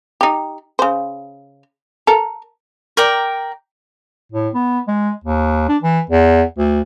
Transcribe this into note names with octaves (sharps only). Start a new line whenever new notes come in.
D#4 G4
C#3 C5
A4 A#4
A#4 D5 G5 A#5
A2
B3
G#3
D#2
D4
E3
E2
D2